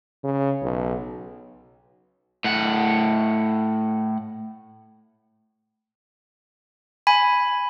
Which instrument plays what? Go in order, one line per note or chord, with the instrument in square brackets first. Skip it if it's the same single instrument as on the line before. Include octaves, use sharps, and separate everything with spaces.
[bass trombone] C#3
B1
[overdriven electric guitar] A2 F#5
[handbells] G#5 B5